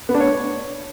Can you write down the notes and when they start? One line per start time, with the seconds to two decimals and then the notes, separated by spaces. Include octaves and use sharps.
0.09 B3
0.14 D4
0.20 C#5